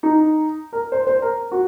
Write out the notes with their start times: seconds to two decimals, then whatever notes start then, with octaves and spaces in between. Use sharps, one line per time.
0.03 D#4
0.73 A#4
0.92 C5
1.07 C5
1.22 A#4
1.52 F#4